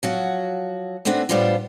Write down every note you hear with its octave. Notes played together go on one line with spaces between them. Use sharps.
F3 F#3 F#4
A3 B3 C4 D4 F#4
A2 F3 G3 B3 D4 F4